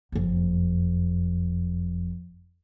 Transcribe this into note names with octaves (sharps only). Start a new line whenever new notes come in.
F#1 F2